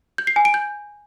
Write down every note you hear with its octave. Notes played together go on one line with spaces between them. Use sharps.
G6
C7
G#5
D7
G6